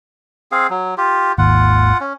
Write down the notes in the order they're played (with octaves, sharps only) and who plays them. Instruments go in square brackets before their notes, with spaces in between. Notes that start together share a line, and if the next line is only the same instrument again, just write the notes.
[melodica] C4 G#4 F5
F#3
F4 G4
[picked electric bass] G#1 D#2 [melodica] F4 F#5
[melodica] C#4